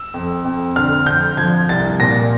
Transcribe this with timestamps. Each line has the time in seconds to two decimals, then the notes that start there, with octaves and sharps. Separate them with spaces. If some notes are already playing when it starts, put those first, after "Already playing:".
Already playing: E6
0.14 F2
0.45 F2
0.76 D3 F6
1.06 F2 G6
1.37 F3 G#6
1.69 C2 A6
2.00 A#2 A#6